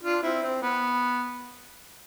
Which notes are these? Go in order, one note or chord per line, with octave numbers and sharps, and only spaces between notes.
D4 F4
C4 E4
C4
B3